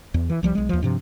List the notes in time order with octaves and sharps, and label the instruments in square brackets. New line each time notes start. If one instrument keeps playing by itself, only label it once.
[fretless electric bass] E2
E3
C2 F3 G3
B1 G#3
D#2 F3
G2 C3 F3